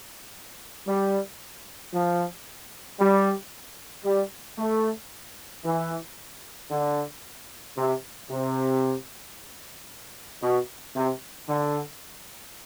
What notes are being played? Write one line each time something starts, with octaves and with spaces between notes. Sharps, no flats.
G3
F3
G3
G3
A3
E3
D3
C3
C3
B2
C3
D3